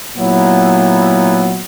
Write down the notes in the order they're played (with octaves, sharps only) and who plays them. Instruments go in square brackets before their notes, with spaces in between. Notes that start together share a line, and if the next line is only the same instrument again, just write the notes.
[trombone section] A#2 F#3 B3 E4